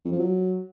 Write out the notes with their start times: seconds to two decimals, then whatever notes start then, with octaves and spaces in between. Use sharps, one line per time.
0.05 F2
0.12 F3
0.19 F#3